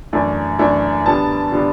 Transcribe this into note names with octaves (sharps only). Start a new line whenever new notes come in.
F#2 E3 A3 D4
F#2 E3 A3 D4
D3 G3 B3 D4 A5
D3 G3 B3 D4